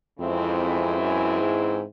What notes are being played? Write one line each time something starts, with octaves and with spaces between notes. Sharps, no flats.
F2 C#3 E3 G#3 C4 E4
F#2
G#2